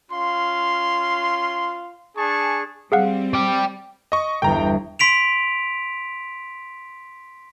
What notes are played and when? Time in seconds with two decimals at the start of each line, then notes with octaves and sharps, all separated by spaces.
0.12 C#4 F4 F5 C6
2.17 D4 G#4 G#5 A5 C#6
2.92 G3 C4 G#4 F5 F#5
3.34 D5 G5
4.12 D#5 C#6
4.42 G1 E2 G5 A#5
4.99 C6 B6 D7 F7